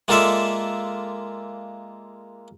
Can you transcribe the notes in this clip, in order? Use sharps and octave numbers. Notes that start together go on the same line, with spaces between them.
G#3 A#3 F4 A4 D5 E5